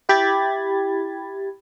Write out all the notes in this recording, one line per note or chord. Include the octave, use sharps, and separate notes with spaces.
E4 G4 B5 G#6 A6